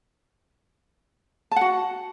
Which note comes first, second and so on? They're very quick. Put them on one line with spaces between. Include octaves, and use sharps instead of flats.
A5 F#5 F#4